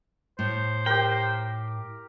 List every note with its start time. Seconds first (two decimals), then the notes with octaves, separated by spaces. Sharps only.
0.39 A2 C5
0.86 G4 A#4 G5